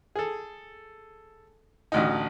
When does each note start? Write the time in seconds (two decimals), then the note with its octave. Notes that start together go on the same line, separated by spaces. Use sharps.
0.15 G#4 A4
1.92 A1 D2 D#4